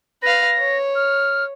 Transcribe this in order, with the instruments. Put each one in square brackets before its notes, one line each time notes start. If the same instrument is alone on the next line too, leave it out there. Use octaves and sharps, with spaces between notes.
[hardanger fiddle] B4 F5 [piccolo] A#6
[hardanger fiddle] C#5
[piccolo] F6